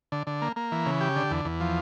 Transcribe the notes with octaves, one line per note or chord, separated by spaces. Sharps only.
D3
D3
A#3
A#3
E3
C#3
G4
D3
E2
E2
F3